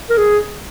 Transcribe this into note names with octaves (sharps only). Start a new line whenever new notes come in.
A#4
G#4